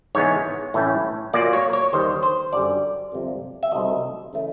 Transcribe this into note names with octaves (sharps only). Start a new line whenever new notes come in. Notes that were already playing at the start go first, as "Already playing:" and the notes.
G#2 E3 G#3 B3 C#5
A2 E3 A3 C#4
A#2 F#3 A#3 D5
C#5
C#5
D#2 D#3 G3 C5
C5
F#2 D3 G3 D5
G1 F2 C3
E5
C2 C3 D#3 F#3 A3 D#5
C#3 E3 A3